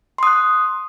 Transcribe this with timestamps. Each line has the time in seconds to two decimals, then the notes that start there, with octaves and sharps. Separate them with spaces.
0.18 C6
0.23 D#6
0.27 F#6